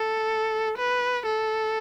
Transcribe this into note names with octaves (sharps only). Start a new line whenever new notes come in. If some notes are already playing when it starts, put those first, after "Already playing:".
Already playing: A4
B4
A4